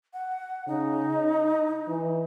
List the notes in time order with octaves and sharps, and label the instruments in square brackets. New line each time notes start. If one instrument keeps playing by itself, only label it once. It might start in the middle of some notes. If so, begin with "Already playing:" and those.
[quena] F#5
[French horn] C#3 [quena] D#4
[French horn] D#5
E3